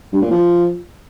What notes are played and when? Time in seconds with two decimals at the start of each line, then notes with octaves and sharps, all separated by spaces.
0.13 G2
0.22 A#2
0.31 F3